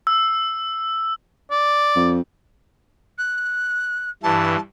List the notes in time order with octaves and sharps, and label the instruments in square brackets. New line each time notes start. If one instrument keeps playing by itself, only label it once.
[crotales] E6
[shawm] D5
[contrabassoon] F2
[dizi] F#6
[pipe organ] G2 E3 [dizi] A5